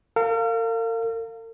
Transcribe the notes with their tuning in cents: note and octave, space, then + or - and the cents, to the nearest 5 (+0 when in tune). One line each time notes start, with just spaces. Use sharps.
A#4 -45 F5 +0